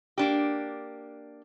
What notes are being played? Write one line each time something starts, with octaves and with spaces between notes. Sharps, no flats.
A#3 D4 G4